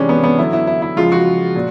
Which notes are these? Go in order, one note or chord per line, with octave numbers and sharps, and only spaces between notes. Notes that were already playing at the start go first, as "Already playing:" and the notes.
Already playing: C3 E3 G#3 C#4 D4
B3
B3
D3 F#3 E4
E4
E4
E4
C#3 F3 G#3 F4
F#4
A#2